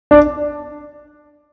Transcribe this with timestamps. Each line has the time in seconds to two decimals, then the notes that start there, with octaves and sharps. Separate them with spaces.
0.11 D4